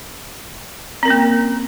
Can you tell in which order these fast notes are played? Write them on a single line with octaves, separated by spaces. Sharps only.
C4 A#4 C#4 A#3